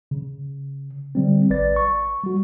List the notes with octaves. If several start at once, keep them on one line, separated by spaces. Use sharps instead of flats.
C#3
D3 G3 C4
A1 B4 D5 A6
C#6
G3 F#4